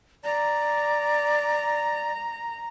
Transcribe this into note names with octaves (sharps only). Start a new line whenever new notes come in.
D5 A#5